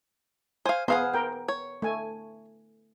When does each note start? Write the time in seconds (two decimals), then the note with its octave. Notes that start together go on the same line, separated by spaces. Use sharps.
0.66 C5 F5 G#5
0.88 B3 G#4 C5 F5 F#5
1.14 A#4 G5
1.48 C#5
1.82 A3 G#5